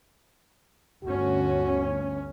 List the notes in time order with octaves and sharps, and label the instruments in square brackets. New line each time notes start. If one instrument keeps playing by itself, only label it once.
[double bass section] G1 D2 C#4 [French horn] F#4